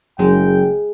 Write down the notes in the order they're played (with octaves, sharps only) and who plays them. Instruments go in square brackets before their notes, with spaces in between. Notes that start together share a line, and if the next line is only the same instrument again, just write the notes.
[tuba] F#1 [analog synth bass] F#3 [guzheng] G#3 [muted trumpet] G5